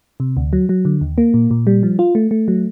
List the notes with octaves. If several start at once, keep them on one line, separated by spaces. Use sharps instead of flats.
C3
D2
F#3
F#3
D3
D#2
A#3
A#2
A#2
G3
F3
F4
A3
A3
F#3